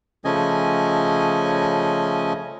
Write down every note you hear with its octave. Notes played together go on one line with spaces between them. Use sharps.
C#3 F3 A3 C#4 D#5 G#5